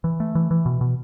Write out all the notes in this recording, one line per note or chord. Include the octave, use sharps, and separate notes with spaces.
E3
A3
E3
E3
B2
B2